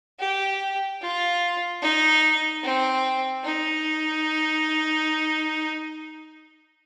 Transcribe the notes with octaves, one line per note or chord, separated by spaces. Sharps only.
G4
F4
D#4
C4
D#4